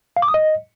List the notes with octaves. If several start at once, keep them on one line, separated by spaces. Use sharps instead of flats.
F5
D6
D#6
D#5